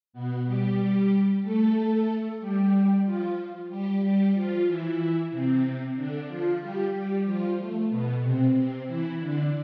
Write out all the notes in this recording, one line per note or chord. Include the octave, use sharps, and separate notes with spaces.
B2 B3
G3 G4
A3 A4
G3 G4
F3 F4
G3 G4
G3 G4
F3 F4
E3 E4
C3 C4
D3 D4
F3 F4
G3 G4
G3 G4
F3 F4
A3
B2 B3
C3 C4
C3 C4
E3 E4
D3 D4